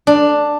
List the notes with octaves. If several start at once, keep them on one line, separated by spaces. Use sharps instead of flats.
D4